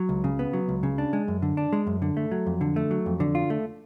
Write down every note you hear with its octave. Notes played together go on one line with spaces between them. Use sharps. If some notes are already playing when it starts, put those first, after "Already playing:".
Already playing: F#3
C#2
C#3
B3
F#3
C#2
C#3
D4
G#3
F#2
D3
D4
G#3
F#2
D3
A3
F#3
F2
D3
A3
F#3
F2
D3
F4
A3